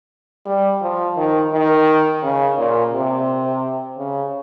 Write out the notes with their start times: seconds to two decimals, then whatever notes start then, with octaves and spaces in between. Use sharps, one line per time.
0.46 G3
0.82 F3
1.17 D#3
1.53 D#3
2.23 C#3
2.57 A#2
2.93 C3
3.98 C#3